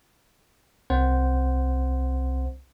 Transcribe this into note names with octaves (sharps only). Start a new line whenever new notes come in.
C2 C4 C5 F#5